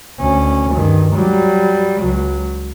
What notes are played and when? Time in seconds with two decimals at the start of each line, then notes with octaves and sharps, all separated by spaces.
0.20 D2 C#4
0.73 G2 D#3
1.14 F#3 G3
1.99 C#2 F#3